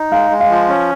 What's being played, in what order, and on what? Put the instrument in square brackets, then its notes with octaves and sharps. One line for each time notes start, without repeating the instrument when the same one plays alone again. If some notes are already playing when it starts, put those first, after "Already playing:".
Already playing: [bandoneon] D#4
[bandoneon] G#3 [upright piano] F5
[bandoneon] G#3
[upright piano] F5
[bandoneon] F3
C#4